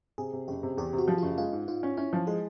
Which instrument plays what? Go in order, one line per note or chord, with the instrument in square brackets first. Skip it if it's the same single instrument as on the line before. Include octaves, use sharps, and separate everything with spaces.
[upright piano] C3 [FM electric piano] G#4
[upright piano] C3
[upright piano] F#1 [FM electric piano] G4
[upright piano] C3
[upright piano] E2 [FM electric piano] G4
[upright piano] C3
[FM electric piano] F#4
[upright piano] F3
[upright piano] F#1 [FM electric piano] F4
[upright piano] G#3 [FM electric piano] F4
[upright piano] G#2
[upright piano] G#2 [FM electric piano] F4
[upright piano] C#4
[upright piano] C#4 [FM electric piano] E4
[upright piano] F3
[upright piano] G#3 [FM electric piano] G#4